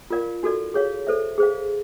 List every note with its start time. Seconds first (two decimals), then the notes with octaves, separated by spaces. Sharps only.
0.10 F4 A#4 D5 F5
0.43 D#4 F#4 A4 D5
0.74 G#4 C#5 F5
1.07 A4 C5 E5
1.38 G#4 C5 F5